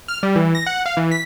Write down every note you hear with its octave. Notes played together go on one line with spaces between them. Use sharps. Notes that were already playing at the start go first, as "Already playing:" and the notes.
F6
G3
E3
A#6
F#5
F5
E3
B6